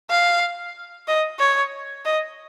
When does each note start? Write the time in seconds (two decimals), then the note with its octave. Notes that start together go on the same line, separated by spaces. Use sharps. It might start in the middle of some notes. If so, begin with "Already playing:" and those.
0.10 F5
1.08 D#5
1.39 C#5
2.05 D#5